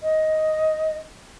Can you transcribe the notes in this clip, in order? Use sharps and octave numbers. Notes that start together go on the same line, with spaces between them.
D#5